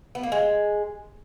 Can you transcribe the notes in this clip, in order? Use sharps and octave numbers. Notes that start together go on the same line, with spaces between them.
B3
A#3
G#3